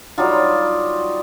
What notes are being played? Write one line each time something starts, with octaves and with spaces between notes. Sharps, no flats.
F#3 G3 D#4 F4